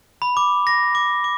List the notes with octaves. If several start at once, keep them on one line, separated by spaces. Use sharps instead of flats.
B5
D6
A#6
D6
D6